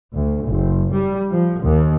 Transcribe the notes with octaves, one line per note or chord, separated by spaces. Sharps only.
D2
F#1
G3
F3
D#2